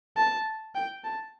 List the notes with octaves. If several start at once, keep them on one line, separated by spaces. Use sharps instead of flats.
A5
G5
A5